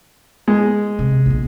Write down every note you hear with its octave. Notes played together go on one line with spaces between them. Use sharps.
G#3
C3 C4
A#1 B3